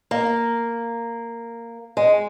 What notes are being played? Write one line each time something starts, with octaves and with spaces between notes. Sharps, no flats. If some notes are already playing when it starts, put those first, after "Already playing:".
A#3
G#3